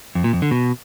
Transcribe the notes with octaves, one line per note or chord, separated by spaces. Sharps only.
F2
A#2
F2
D3
B2